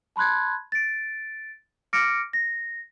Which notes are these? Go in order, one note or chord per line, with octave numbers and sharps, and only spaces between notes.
A5 B5 C6 F#6 G#6
A6 D7
D6 F6 A#6 C#7 D7
A#6